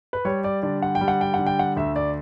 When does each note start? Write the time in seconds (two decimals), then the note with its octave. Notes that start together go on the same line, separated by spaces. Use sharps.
0.13 B4
0.25 G3 C#5
0.44 D5
0.63 D3 D5
0.82 F#5
0.95 G5
1.01 G3
1.08 F#5
1.21 G5
1.34 F#5
1.39 D3
1.46 G5
1.59 F#5
1.76 D2 E5
1.96 D5